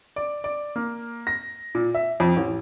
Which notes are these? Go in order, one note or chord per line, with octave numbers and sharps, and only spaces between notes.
D5
D5
A#3
A#6
A#2
E5
F2
A1